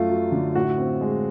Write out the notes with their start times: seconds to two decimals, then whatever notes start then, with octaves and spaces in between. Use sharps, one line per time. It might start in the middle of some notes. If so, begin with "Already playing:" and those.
Already playing: F#2 A3 F4
0.10 F#3
0.32 D3
0.55 A2 F#4
0.78 C4
1.01 G#3